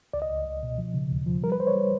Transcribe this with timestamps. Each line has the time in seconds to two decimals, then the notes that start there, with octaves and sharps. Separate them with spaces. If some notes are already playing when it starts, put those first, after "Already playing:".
0.13 C#2 D5
0.22 D#5
0.29 C#2
0.46 C#2
0.63 B2
0.78 F3
0.94 C#3
1.11 D#2
1.26 F3
1.43 G3 A#4
1.52 B4
1.60 E3 C5
1.67 C#5
1.75 G3